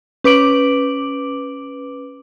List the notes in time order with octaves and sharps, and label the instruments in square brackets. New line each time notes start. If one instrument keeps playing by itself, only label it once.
[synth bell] C#4 B4 D6 D7 F#7